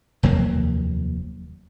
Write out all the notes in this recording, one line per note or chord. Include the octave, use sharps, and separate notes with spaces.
F1 D#2 F#3 A#3